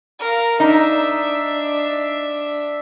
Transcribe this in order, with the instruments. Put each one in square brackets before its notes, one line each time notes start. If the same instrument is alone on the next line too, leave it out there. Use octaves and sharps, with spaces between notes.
[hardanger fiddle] A#4 F5
[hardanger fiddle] D4 E5 [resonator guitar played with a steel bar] D#4